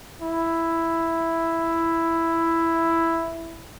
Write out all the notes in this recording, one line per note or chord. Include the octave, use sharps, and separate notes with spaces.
E4